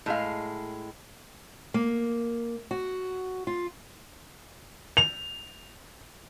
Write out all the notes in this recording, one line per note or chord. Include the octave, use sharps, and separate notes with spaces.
A2 G#3 F5
A#3
F#4
F4
F7